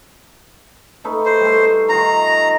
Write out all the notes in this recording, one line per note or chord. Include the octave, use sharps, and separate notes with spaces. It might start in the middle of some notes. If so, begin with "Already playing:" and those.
A3 D#4 B4
C5
G3 A3
D#3 F4 A#5